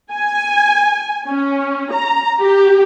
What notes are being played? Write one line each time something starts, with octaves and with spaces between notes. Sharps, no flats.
G#5
C#4
A#5
G4